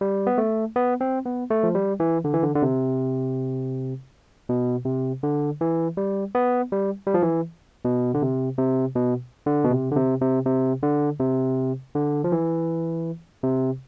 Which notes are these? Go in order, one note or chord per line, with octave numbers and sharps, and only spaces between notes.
G3
B3
A3
B3
C4
B3
A3
F3
G3
E3
D3
E3
D3
D3
C3
B2
C3
D3
E3
G3
B3
G3
G3
F3
E3
B2
D3
C3
C3
B2
D3
B2
C3
D3
C3
C3
C3
D3
C3
D3
F3
E3
C3